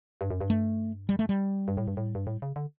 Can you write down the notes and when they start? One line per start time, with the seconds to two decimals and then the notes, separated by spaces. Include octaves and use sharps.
0.21 G2
0.30 F#2
0.41 G2
0.50 A3
1.09 G3
1.19 A3
1.29 G3
1.68 G2
1.77 A2
1.88 G2
1.97 A2
2.15 G2
2.27 A2
2.42 C#3
2.56 D3